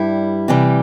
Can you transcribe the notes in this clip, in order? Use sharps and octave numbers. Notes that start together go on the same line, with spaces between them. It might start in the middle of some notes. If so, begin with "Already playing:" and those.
Already playing: G2 G3 E4
C3 E3 G3